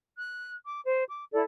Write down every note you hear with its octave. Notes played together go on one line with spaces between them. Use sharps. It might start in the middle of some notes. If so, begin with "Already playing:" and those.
F#6
D6
C5
D6
E4 A4 D5